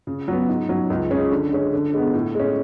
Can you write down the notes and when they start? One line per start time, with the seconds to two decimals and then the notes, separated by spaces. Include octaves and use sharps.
0.07 C#3
0.28 F#3 B3
0.49 G#2
0.69 F#3 C#4
0.90 C#2
1.11 C#3 G#3 C#4 G#4
1.32 D3
1.52 G#3 C#4
1.73 D3
1.94 G#3 B3
2.14 A2
2.35 G#3 C#4